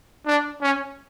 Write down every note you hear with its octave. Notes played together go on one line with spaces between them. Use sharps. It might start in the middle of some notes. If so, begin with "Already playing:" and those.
D4
C#4